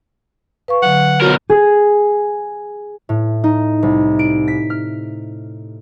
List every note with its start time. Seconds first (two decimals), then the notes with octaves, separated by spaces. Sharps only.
0.68 B4 F5 C#6
0.82 D3 F#3 F#5
1.21 B2 F#4 A#4 C#5
1.50 G#4
3.09 A2
3.44 D#4
3.83 C2
4.19 D7
4.48 B6
4.70 F6